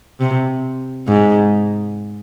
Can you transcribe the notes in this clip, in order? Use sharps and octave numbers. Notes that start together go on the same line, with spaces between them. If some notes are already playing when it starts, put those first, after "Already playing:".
C3
G#2